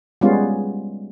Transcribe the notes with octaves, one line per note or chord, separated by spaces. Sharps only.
G3 G#3 B3 C#4 F4